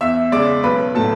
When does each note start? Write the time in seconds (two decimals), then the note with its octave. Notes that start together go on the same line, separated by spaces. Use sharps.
0.01 E2 E5 E6
0.32 C#3 G#3 D5 D6
0.64 B1 B4 B5
0.95 A2 F#3 A4 A5